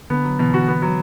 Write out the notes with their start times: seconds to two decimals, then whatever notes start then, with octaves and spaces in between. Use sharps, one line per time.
0.10 D3 B3
0.24 F#3
0.39 B2 E3
0.53 D3 F#4
0.68 B3
0.82 F#3